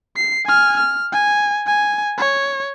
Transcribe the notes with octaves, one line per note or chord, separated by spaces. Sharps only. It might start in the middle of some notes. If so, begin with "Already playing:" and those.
C7
G#5 F6
F6
G#5
G#5
C#5